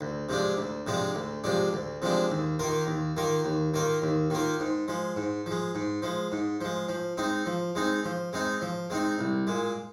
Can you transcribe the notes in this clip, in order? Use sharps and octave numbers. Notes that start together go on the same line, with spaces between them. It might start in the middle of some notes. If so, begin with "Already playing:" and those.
D2
C3 F3 G#3 D4
D2
C3 F3 G#3 D4
D2
C3 F3 G#3 D4
D2
C3 F3 G#3 D4
D#2
D#3 A#3 F4 A#4
D#2
D#3 A#3 F4 A#4
D#2
D#3 A#3 F4 A#4
D#2
D#3 A#3 F4 A#4
G#2
F3 G#3
G#2
F3 G#3
G#2
F3 G#3
G#2
F3 G#3
F3
G#3 C4 D#4
F3
G#3 C4 D#4
F3
G#3 C4 D#4
F3
G#3 C4 D#4
C2
A#2 G#3